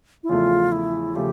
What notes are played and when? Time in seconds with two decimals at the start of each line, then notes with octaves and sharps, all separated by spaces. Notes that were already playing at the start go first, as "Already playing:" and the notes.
0.23 E4
0.29 E2 C#3 F3 A3 F4
0.72 E4
1.15 C#3 F3 A3 G4